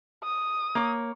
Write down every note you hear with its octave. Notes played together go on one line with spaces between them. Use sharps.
D#6
A#3 C#5